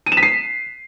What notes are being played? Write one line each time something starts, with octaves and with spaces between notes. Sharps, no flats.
D#7
E7
B6
C7